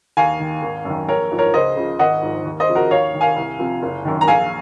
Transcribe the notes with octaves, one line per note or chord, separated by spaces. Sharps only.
D#2 F5 G#5
D#3
G#1
F#2 D#3
A#1 A#4 C#5
G#2 F3
A#4 C#5
C#2 C5 D#5
C#3 F3
G#1 D#5 F#5
G#2 F3
D#2
C5 D#5
C#3 F3
F#4 A#4
D#2 C#5 F5
D#3
F5 G#5
C2
C3 F3
F#1
F#2 D#3
A#5
A#1 F5 G#5